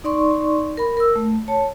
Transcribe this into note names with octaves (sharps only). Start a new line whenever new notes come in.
D#4 D5 C6 C#6
A#4 B5
A#4 E6
A3
C#5 A5